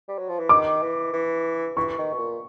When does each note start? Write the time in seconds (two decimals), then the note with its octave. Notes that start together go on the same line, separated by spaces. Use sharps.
0.08 G3
0.18 F#3
0.29 F3
0.39 E3
0.49 D#3 D6
0.82 E3
1.13 E3
1.77 E3 C#6
1.98 D#3
2.13 B2
2.18 A#2